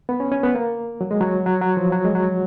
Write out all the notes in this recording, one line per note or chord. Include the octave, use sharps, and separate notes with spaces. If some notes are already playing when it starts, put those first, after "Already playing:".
B3
C#4
C#4
B3
A#3
F#3
G#3
F#3
F#3
F#3
F3
F#3
G#3
F#3